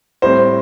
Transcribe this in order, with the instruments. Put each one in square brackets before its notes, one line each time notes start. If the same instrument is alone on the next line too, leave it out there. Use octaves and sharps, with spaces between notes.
[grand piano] A2 G3 C4 C5